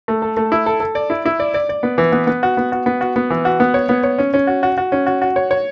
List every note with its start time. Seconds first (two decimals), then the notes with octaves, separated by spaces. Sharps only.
0.08 A3
0.22 A4
0.37 A3
0.52 E4
0.66 A4
0.80 A4
0.95 D5
1.10 E4
1.25 E4
1.40 D5
1.54 D5
1.69 D5
1.83 B3
1.98 E3
2.12 B3
2.27 B3
2.43 F#4
2.57 B3
2.72 F#4
2.86 B3
3.01 F#4
3.16 B3
3.30 E3
3.45 F#4
3.60 B3
3.74 C#5
3.89 B3
4.04 C#5
4.18 C#4
4.34 C#4
4.47 F#4
4.63 F#4
4.78 F#4
4.92 C#4
5.07 F#4
5.22 F#4
5.36 C#5
5.51 C#5